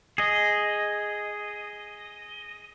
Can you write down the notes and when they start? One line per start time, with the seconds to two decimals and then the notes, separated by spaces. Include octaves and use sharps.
0.18 G#4 D#5